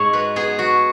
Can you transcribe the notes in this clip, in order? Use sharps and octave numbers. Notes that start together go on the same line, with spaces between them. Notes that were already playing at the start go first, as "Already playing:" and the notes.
Already playing: G#2 C#5
F#3 B4
B3 G#4
F#3 F#4